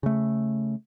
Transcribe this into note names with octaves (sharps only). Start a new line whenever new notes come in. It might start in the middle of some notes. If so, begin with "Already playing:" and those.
C#3 A3